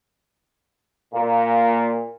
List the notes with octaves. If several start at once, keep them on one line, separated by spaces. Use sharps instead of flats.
A#2